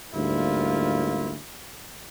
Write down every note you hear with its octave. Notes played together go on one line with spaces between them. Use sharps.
D2 G#2 G3 A#3 E4 F4